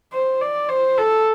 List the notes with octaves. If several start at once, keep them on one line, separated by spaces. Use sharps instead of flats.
C5
D5
C5
A4